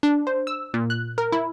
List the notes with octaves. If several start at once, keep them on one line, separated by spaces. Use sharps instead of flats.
D4
C5
E6
A#2
F#6
A#4
E4